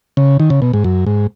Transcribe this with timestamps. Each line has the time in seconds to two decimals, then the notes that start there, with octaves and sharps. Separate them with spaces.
0.17 C#3
0.40 D#3
0.50 C#3
0.62 B2
0.73 G#2
0.84 F#2
1.06 G#2